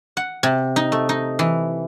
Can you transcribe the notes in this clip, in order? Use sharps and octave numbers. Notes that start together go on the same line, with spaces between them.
F#5
C3
D#4
A3
D#4
E3